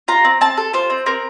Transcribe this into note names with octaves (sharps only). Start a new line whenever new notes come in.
F4 A#5
C4
C4 A5
A4
F4 C5
C4
C4 A#4